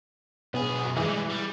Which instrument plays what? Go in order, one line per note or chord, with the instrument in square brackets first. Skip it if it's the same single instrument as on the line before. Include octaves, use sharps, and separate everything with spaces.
[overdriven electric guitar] B1 G#4 [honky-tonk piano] B3
[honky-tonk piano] F#2
[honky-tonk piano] E3 [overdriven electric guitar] G3 G#3
[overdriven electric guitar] G3